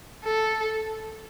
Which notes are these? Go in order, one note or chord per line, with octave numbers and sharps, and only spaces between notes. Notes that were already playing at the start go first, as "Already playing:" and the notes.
A4